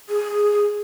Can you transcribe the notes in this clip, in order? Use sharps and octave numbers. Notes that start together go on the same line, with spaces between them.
G#4